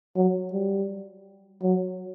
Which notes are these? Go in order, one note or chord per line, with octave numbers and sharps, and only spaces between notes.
F#3
G3
F#3